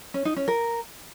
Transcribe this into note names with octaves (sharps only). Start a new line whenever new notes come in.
C#4
D#4
C#4
A#4